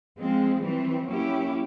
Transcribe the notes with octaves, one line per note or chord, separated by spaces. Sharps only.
F3 G#3 C4
E3 G3 C4
F#3 A#3 C#4 E4 G4